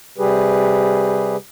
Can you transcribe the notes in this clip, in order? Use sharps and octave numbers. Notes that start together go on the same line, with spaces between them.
C3 G3 G4 G#4 B4